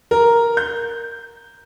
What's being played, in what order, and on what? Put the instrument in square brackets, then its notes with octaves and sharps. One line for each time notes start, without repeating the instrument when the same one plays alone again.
[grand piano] A#4
G6